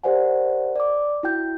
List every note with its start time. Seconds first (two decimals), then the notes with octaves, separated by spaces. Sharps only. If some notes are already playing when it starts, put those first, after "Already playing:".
0.04 G4 A#4 C5 D5 F#5 G#5
0.76 D5 D6
1.23 E4 F#4 G5 G6